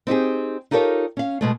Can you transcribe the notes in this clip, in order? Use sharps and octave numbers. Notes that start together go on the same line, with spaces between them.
C4 D#4 G4 G#4
D#4 F4 G4 A4 A#4 C#5
C#4 F5
B2 G#3 A3